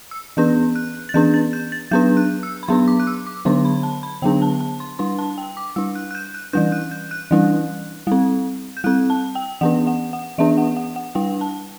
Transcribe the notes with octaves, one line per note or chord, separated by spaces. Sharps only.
E6
E3 B3 D4 G6
F#6
A6
E3 B3 D4 G6
A6
G6
A6
F#3 B3 D4 G6
F#6
E6
B5
F#3 B3 D4 C6
D6
F#6
E6
D6
D3 F#3 B3 D4 C6
B5
A5
B5
D3 F#3 B3 D4 G5
A5
A5
C6
G3 D4 C6
A5
G5
D6
G3 D4 E6
F#6
F#6
G6
F#6
E3 G3 D4 G6
F#6
G6
F#6
E3 G3 D4
G3 C4
G6
G3 C4 F#6
A5
G5
E3 B3 D4 F#5
F#5
F#5
E3 B3 D4 E5
F#5
F#5
F#5
G3 D4 G5
A5